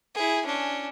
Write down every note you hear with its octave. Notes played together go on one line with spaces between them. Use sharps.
E4 G#4
C#4 D4